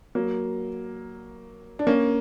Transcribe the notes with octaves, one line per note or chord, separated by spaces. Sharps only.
F#3 A#3
D4
A#3 C#4